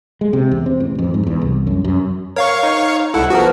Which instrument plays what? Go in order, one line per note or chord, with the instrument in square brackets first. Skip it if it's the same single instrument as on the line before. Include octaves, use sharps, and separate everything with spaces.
[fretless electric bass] G#3
C3
E2
C4
A1
F2
G#2
E2
C2
F#2
F#2
[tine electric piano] A#4 [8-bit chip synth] C#5 F5 C#6
[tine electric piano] D#4
[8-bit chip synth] C2 E4 [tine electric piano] A4 F#5
[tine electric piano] F3 B3 A#4 [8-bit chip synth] F#4